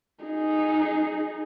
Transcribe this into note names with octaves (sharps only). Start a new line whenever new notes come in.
D#4 G#4